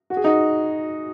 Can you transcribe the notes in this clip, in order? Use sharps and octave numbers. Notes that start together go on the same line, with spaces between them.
F#4
G#4
D#4 F#4